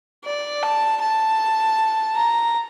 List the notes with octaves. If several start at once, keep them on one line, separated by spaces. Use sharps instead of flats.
D5
A5
A5
A#5